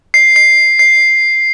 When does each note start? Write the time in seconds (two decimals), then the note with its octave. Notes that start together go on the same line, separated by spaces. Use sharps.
0.14 C7
0.36 C7
0.79 C7